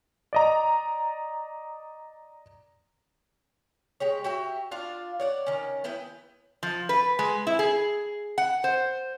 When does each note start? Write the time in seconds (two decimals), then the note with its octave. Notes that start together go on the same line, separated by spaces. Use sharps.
0.33 D5 D#5 A#5
4.00 G#3 G4 C#5
4.24 F#4 G4 E5
4.71 D4 F4 F5
5.20 C#5 D5 F#5
5.46 D#3 C#4
5.84 B3 E4 B4 G5
6.63 F3
6.89 B4
7.19 G#3
7.47 E4
7.59 G#4
8.38 F#5
8.64 C5